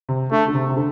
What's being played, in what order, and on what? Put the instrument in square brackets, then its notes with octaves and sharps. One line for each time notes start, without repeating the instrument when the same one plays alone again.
[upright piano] C3
[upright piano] D3 [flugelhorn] A3
[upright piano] D3
C3
C3
D3